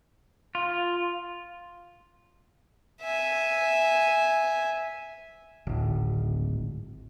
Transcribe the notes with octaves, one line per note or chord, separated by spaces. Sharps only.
F4
E5 G#5
D1 G#1